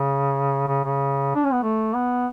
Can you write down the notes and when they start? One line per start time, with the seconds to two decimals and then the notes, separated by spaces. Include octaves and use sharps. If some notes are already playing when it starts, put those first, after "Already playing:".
Already playing: C#3
0.68 C#3
0.84 C#3
1.35 D4
1.44 C#4
1.53 B3
1.63 A3
1.94 B3